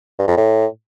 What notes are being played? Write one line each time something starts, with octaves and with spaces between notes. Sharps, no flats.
G2
F2
A2